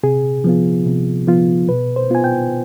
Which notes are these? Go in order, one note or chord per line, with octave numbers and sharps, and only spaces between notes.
C3 G#4
F3 B3 F4
C3
F3 B3 F4
B2 B4
C5
B3 F4 G#5
G5